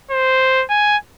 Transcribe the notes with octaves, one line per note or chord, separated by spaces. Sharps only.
C5
G#5